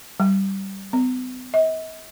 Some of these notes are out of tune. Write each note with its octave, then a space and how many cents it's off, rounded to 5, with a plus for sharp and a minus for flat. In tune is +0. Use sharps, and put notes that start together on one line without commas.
G3 -15
B3 +45
D#5 +45